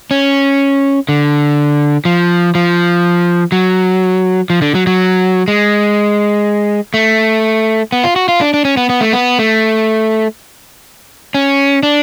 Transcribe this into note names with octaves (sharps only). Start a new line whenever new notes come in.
C#4
D3
F3
F3
F#3
F3
D3
F#3
F#3
G#3
A3
B3
F4
F#4
F4
D4
D4
C#4
B3
B3
A3
B3
A3
C#4
D4